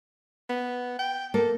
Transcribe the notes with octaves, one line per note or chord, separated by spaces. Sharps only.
B3
G5
A#3 A4